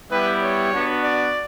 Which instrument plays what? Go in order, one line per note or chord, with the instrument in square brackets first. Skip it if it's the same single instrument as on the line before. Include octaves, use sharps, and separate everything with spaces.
[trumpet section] G3 B3 E4 G4 B4
C#5
B3 D4 F#4
D5